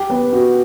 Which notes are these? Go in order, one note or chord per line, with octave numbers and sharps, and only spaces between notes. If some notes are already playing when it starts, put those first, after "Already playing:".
Already playing: G4 G5
B3 B4
F#4